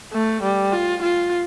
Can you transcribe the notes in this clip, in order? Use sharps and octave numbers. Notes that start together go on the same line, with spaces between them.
A3
G3
F4
F4